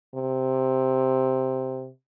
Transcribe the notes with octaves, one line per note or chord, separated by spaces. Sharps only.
C3